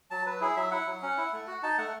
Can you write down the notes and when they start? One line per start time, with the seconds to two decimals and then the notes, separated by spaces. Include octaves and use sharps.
0.11 F#3 A5
0.26 F#3 B4
0.41 E4 G#4
0.56 F#3 E5
0.71 E4 F#5
0.87 F#3
1.02 C#4
1.18 E4
1.33 A3
1.47 F#4
1.63 D#4 A5
1.78 A3 F#5